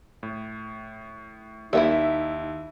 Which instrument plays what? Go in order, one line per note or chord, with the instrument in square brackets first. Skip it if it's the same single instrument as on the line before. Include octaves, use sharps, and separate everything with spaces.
[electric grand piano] A2
[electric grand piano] D#2 [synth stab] G3 A#3 [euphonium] D#4 [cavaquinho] E4 F#4 E5